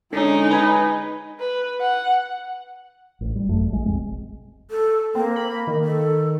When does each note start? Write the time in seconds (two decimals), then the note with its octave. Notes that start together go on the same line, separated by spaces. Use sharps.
0.13 D3 G#3 C#4 D#4
0.51 B4 G#5 B5
1.40 B4
1.80 F#5
3.21 A1
3.36 G3
3.48 G#1 F#2 F#3 A3
3.72 A#1 G#3
3.85 F1 B1 G#3 C4
4.71 A4
5.15 A#3 C4
5.36 B5
5.67 D#3
5.84 A4